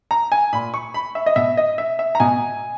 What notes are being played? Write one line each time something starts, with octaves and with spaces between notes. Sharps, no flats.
A#5
G#5
A#2 B5
C#6
B5
E5
D#5
B2 E5
D#5
E5
E5
A#5
B2 G#5